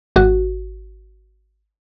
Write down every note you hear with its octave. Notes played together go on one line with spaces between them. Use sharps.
G#1 F#4